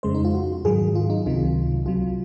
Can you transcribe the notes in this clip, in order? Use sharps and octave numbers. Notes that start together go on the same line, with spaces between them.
F2 C#3 G#3 C5
D#4
F4
F#4
G#2 D#3 F#3 G#4
F4
D#4
C#2 C3 D#3 F#3 F4
C2 C3 F#3 F4